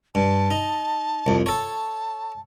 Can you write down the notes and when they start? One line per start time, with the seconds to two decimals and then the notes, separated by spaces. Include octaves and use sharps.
0.15 G2 A5
0.51 D#4
1.26 C2 F2
1.46 A4 C#5 A5